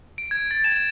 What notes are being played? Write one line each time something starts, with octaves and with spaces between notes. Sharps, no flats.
D7
G#6
A6
E7
E7